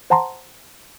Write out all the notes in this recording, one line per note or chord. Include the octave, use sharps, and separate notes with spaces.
C5 F#5 A5 A#5 C6